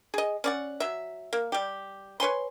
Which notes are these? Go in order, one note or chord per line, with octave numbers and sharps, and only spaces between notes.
G#4 D#5
C#4 D5 F#5
F#3 E5
A#3
G3 G4
B4 C#5 G#5 C6